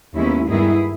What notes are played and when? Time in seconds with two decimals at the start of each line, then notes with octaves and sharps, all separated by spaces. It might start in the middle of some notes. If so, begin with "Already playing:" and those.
0.15 D#2 D#3 G#3 B3 C#4 E4
0.49 G2 D#3 G3 B3 E4 G#4